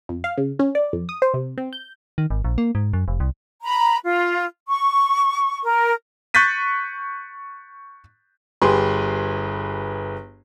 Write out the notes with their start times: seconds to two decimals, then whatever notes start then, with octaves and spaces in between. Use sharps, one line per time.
0.09 F2
0.24 F5
0.38 C#3
0.59 C#4
0.75 D5
0.93 F2
1.09 D#6
1.22 C5
1.34 C3
1.58 C4
1.73 G6
2.18 D#3
2.30 G#1
2.44 A#1
2.58 A#3
2.75 G#2
2.93 F#2
3.08 F1
3.20 C2
3.63 A#5 B5
4.04 F4
4.68 C#6
5.62 A#4
6.34 C#6 F#6 G6 A6 B6 D#7
8.62 G1 G4 G#4 B4 C6